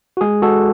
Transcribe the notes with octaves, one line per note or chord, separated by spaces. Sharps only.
F#4
G#3 G#4
G#3 F#4 A4